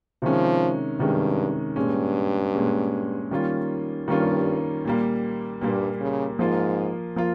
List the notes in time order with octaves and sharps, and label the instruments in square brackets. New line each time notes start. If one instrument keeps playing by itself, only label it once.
[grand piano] C3 D#3 G#3 C#4 [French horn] F3
[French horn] G2 [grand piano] C3 D#3 G#3 C#4
[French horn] G2 [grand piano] A#2 G#3 C#4
[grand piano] A#2 G#3 C#4
D#3 G3 A#3 C#4 F4
[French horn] G2 [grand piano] D#3 G3 A#3 C#4 F4
[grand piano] A#2 G3 A#3
[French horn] G2 [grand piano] A#2 G3 A#3
[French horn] C#3
[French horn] G#2 [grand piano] F3 A#3 F4
[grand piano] F3 A#3 F4